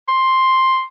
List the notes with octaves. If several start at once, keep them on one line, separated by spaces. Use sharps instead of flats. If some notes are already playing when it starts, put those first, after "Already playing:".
C6